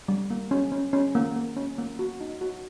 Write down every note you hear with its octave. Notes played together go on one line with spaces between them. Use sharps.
G3
A#3
C#4
C#4
C#4
A#3
A#3
C#4
A#3
F#4
D#4
F#4